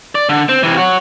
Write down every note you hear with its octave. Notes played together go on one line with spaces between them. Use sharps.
D5
D3
C4
C3 E3
F#4 C#5